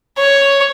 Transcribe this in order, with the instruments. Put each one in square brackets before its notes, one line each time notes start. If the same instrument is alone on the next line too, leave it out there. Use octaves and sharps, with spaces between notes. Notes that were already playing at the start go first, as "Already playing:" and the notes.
[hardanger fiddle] C#5